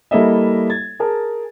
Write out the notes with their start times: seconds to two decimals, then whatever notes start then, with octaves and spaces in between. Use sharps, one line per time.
0.11 G3 A#3 E4 A4 D#5 E5
0.70 G#6 A6
1.00 G#4 A#4 A5